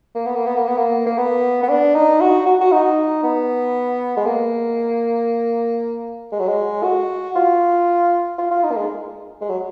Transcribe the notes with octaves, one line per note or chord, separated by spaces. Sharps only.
A#3
B3
A#3
B3
A#3
B3
A#3
A#3
B3
B3
D4
D#4
F#4
F#4
F#4
D#4
B3
G#3
A#3
G#3
F#3
G#3
F#4
F4
F4
F4
D#4
A#3
G#3
G#3
F#3